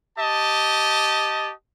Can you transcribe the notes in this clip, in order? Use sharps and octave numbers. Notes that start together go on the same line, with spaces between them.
G4 D#5 A5